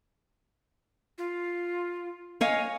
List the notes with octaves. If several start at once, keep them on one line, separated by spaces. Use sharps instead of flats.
F4
C#5 D#5 F5 G#5